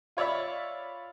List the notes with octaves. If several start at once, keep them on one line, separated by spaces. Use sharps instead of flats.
F4 C#5 D5 E5 B5